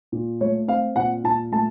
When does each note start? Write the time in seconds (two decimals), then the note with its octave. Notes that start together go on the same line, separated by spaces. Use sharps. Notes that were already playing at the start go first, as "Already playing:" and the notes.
0.12 A#2
0.41 A3 C#5
0.68 C4 F5
0.96 A#2 F#5
1.24 A#2 A5
1.52 A3 A5